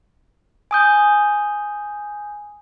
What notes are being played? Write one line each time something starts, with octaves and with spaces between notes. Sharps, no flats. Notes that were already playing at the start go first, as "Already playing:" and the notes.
G#5 D#6 G6